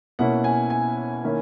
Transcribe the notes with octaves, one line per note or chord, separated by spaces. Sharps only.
B2 A#3 C#4 E4 F#5
G#5
G#5
D#3 A#3 C#4 E4